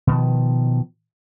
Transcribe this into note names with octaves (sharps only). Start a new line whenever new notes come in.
B2 D#3 F3